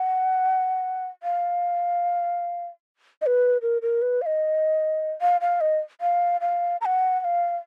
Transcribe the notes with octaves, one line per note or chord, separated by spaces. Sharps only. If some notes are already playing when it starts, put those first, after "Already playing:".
Already playing: F#5
F5
D#5
B4
A#4
A#4
B4
F5
D#5
F5
F5
D#5
F5
F5
A#5
F#5
F#5
F5